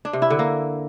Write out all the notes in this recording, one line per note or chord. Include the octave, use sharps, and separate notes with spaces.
D4
C3
E4
D3
A#3